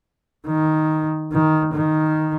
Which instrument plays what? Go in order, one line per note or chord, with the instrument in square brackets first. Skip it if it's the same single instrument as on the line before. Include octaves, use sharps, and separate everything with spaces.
[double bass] D#3
D#3
D#3